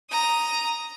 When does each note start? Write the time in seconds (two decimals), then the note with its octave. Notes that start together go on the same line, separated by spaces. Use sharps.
0.10 A#5 D#6